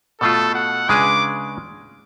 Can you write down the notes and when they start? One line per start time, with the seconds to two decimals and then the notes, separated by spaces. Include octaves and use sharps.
0.21 B2 A3 F4 A4
0.55 F#5
0.89 C#3 G#3 D4 G#4 B4 D6